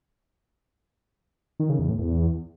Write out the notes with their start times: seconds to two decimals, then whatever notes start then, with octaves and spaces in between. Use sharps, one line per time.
1.60 D#3
1.69 C#3
1.79 E2
1.89 A2
1.99 E2